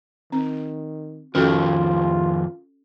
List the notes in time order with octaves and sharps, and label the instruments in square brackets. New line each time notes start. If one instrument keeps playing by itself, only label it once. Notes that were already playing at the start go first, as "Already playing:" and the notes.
[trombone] D#3 [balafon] C4
[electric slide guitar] F2 D#3 A#4 [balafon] C#4 F#4 A4 [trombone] F4